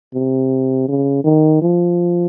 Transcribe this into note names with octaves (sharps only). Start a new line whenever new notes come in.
C3
C#3
D#3
F3